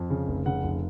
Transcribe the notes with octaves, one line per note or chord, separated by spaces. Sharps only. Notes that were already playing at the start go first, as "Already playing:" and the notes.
Already playing: F2
C#3
F1
C#3 F#5
F1